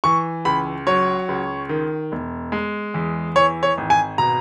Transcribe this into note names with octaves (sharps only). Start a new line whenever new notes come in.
E3 C#6
C#2 B5
F#3 C#5
C#2
D#3
E1
G#3
E2
E3 C#5
C#5
G#1
G#5
B2 A#5